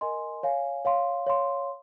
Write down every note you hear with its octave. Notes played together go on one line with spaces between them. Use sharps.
A#4 D#5 G#5 C6
C#5 F5 G#5
C#5 F5 C6
C#5 F5 C6